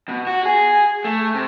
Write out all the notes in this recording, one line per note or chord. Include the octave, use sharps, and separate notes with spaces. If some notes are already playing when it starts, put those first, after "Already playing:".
B2
F#4
G#4
A3
C3